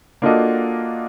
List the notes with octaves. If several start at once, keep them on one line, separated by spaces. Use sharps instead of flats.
A#3 D4 F4 F#4 A4 D#5